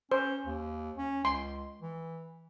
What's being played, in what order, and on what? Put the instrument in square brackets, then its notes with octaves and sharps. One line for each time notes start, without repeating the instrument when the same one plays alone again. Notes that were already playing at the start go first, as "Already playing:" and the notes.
[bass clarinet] C#4 [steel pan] C5
[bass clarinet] D#2
C#4
[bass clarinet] C#2 [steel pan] C6
[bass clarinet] E3